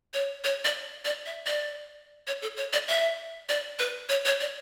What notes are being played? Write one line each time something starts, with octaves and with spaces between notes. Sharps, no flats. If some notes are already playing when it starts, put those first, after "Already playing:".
C#5
C#5
D5
D5
E5
D5
C#5
A4
C#5
D5
E5
D5
B4
C#5
C#5
D5